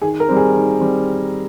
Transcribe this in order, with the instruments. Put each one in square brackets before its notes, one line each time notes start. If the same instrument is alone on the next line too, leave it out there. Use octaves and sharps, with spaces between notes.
[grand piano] D#3 [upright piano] G#4
[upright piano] A#4
[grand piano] G3 C4
[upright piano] G#4
[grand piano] D#3
G3 C4